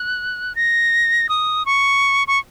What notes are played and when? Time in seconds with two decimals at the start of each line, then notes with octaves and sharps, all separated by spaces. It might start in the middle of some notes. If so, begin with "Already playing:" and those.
Already playing: F#6
0.56 A#6
1.29 D#6
1.66 C#6
2.28 C#6